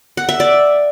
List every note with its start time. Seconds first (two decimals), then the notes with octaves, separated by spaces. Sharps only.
0.17 F#5
0.29 E5
0.40 D5